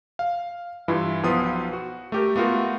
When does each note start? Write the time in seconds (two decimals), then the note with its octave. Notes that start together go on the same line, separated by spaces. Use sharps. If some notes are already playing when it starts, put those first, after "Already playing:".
0.19 F5
0.88 G2 E3 E4 F4
1.23 B1 F3 B3 F4 D#6
1.73 F#4
2.12 A3 G4 A#4
2.36 A3 B3 F4 F#4 A#4